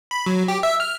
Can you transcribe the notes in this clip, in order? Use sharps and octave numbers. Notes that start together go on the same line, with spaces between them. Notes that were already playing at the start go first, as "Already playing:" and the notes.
B5
F#3
G4
E5
F6